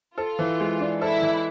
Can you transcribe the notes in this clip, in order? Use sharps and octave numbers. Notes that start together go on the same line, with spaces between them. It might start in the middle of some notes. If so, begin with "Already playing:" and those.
F4 A4
E3
G#3
D4
E4 A4
E3